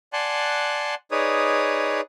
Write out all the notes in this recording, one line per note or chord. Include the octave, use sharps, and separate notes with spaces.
D5 F#5 G#5 A5 C6 F#6
D#4 G#4 B4 C#5 D5 D#6